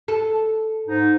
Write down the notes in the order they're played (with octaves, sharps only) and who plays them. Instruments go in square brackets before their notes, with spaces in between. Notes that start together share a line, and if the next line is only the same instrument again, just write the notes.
[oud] A4
[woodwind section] G#2 D#4